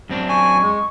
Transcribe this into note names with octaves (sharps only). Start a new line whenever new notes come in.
F#2 C4 D4
G#5 C#6
G#3